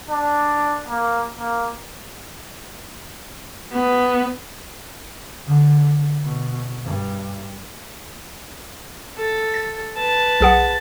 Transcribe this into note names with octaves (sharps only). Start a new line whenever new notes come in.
D4
A#3
A#3
B3
D3
B2
G2
A4
A6
B4 A5
B1 G#4 F#5